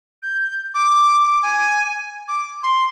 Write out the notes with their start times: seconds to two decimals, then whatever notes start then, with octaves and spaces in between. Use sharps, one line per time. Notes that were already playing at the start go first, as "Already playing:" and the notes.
0.23 G6
0.74 D6
1.42 G#5
2.28 D6
2.63 C6